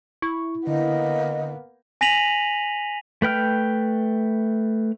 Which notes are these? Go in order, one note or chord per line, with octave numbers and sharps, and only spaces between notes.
E4 C#6
D3 A#3 B3 D#5
G#5 A#6 B6 D#7 F7 F#7
A3 B4 G5 F6